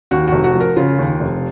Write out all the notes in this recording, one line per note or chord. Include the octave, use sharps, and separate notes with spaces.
D#2 F#4
F1 F#4
F#4
F3
A#4
C#3 F4
D#2
F1